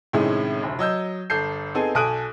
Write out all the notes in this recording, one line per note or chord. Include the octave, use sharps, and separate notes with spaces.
A2 C3 D#3 G#3 C#4 G#4
F1 D2
F#3 D#5 E6 G6
G1 A4 G6 C7
B3 C4 D#4 G#4 A4 G#5
B1 A4 G#5 D#6 F#6 D7